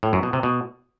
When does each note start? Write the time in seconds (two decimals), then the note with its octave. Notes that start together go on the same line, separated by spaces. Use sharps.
0.03 A2
0.13 F#2
0.23 B2
0.33 C3
0.43 B2